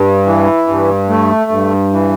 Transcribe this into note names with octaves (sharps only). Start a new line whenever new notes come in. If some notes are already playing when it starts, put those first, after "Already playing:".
Already playing: G2
E3
G2
A3
G2
E3